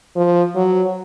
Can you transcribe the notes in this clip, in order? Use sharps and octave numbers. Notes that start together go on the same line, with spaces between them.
F3
F#3